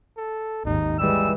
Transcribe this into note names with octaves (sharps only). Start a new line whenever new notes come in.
A4
G#1 D#2 D#4
E3 G3 G#3 E6